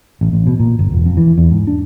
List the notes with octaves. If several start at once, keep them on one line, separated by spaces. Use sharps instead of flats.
A1
A1
B2
A#2
G1
E1
F2
E3
E2
G#2
D4